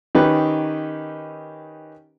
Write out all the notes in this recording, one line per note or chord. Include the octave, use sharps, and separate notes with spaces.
D#3 C#4 D#4 G4 B4